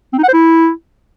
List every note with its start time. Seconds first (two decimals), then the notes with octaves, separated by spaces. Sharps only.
0.13 C4
0.18 D#4
0.23 F#5
0.28 C5
0.33 E4